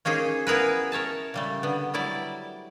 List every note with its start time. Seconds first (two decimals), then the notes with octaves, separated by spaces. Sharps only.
0.05 A#3 C#4 D#4 G#4 C5
0.47 B3 E4 G#4 A#4 B4
0.92 A#4 C#5 E5 A5
1.34 C#3 G3 A3
1.63 D3 B3
1.94 F#3 G3 E4 D5